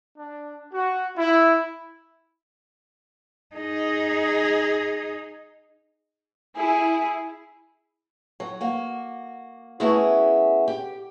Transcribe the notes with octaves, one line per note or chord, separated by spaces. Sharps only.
D4
F#4
E4
D#4 G#4
E4 G#4
F#3
A#3 F#4
A3 B3 C#4 E4 F#4 G#4
G4